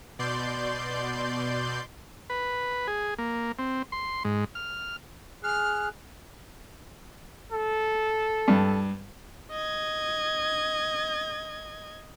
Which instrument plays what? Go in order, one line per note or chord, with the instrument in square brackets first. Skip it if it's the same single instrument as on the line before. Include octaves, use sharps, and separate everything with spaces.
[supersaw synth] B2 D5 C6 G6
[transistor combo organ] B4
G#4
A#3
C4
C6
G#2
F6
[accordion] G#4 F#6 [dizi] F6
[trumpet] A4
[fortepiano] G2
[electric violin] D#5 G#6